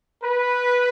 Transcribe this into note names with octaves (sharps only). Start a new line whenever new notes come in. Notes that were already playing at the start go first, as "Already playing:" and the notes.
B4